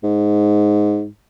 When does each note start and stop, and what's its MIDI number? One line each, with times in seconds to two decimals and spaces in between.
0.04 1.06 44